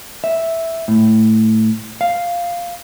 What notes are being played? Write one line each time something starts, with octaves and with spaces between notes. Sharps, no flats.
E5
A2
F5